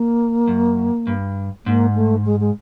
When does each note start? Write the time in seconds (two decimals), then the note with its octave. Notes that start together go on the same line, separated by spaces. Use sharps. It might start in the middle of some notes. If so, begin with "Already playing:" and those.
Already playing: A#3
0.48 F#2
1.07 G2
1.66 G#2 A#3
1.95 A3
2.25 G#3
2.40 G#3